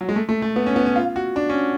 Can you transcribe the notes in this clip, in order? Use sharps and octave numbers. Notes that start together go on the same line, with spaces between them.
F#3
G#3
A3
A3
A3
B3
C#4
B3
C#4
F4
F#4
D4
C#4